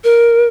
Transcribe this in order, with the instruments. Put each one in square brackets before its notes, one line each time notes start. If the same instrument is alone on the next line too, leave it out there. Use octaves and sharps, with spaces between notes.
[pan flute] A#4